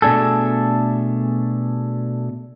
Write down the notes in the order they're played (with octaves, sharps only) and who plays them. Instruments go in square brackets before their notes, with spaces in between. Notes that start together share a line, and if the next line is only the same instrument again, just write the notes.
[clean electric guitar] B2 A3 D4 G#4 A4